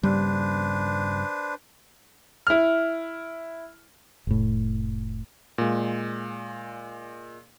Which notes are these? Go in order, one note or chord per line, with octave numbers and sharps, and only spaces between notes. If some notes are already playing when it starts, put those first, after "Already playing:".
G2 C#3 G3 D4 B4 C5
E4 F6
F1 A2
A#2 G#3